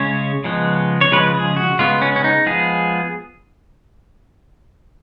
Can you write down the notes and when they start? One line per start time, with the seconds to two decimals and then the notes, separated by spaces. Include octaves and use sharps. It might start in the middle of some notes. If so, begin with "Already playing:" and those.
Already playing: C#3 G#3 C#4 C#5
0.44 C#3 F3 G#3 B3
1.01 C#5
1.12 C#3 F3 G#3 B4
1.34 G#4
1.56 F#4
1.79 C#3 G#3 B3 F4
2.02 C#4
2.16 C#4
2.24 D#4
2.46 F3 G#3 B3 G#4